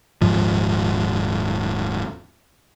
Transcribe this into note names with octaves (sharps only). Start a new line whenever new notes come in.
D#1 G#2 F3